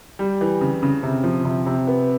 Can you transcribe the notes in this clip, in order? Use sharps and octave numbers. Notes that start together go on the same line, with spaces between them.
G3
E3
C#3
C#3
C3
F3
C3
C3
B3